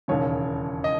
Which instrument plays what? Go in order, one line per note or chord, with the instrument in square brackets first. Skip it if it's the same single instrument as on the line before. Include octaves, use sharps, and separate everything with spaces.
[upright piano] E1 D#2 C#3 C#5
D#5